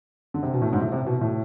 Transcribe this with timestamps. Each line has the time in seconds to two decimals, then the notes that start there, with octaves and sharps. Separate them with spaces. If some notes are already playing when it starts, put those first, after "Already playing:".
0.34 D3
0.43 C3
0.53 B2
0.62 A2
0.73 G#2
0.82 A2
0.92 C3
1.06 B2
1.21 A2